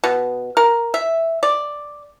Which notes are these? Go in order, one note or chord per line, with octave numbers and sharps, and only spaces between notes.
B2
A#4
E5
D5